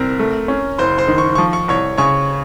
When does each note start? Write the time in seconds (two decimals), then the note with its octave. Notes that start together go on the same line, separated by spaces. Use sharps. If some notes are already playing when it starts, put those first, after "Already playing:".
Already playing: C2 C4 A#4 A#5
0.19 A3
0.48 C#4
0.78 F#1 C5 C6
0.98 C5 C6
1.08 D#3
1.18 C#6
1.35 F3 C#6
1.53 C#6
1.68 C2 C#5 C#6
1.98 C#3 C#5 C#6